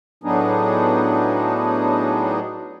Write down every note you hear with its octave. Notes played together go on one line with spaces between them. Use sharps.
A2 F#3 B3 D4 D#4 G#4